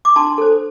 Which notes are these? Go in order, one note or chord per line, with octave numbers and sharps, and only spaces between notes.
D6
D4 A5 C6
A4 C5